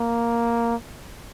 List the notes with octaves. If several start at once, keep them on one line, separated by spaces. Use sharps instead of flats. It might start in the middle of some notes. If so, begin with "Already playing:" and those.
Already playing: A#3